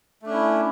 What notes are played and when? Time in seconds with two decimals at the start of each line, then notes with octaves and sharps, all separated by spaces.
0.22 A3
0.26 D4
0.30 C#4
0.33 E4